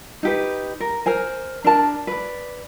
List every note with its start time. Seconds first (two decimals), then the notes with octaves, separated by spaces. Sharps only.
0.23 D#4 G4 B4
0.80 A#4
1.06 A#4 C5 G#5
1.64 D4 A#4 A5
2.07 B4 D5